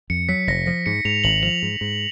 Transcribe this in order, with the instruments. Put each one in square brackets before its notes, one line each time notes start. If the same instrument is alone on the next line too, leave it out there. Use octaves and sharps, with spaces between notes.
[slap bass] F2 [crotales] C#7
[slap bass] F#3 [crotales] B6
[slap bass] F1 [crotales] A#6
[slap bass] F3 [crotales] A#6
[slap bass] G#2 [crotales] C#7
[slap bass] G#2 [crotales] F7
[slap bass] G#1 [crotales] F#7
[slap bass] F3 [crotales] F7
[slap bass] G#2
G#2